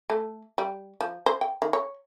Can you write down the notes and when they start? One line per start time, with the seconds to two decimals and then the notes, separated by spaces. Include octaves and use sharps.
0.10 A3
0.58 G3
1.01 F3
1.26 C5
1.41 G5
1.62 D#3
1.73 C#5